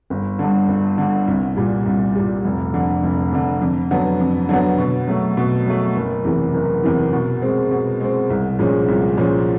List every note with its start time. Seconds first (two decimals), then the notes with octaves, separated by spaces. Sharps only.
0.10 G1
0.39 G2 D3
0.68 G1
0.98 G2 D3
1.27 C2
1.56 A#2 G3
1.86 C2
2.15 A#2 G3
2.45 F1
2.74 F2 D3
3.03 F1
3.32 F2 D3
3.62 F2
3.91 D3 F#3 B3
4.20 F2
4.49 D3 F#3 B3
4.78 B2
5.07 F#3 A3
5.37 B2
5.66 F#3 A3
5.96 F#1
6.25 E2 C3 E3
6.54 F#1
6.83 E2 C3 E3
7.13 B2
7.42 G#3 C4
7.71 B2
8.00 G#3 C4
8.30 C2
8.59 A#2 F3 G#3 C#4
8.88 C2
9.17 A#2 F3 G#3 C#4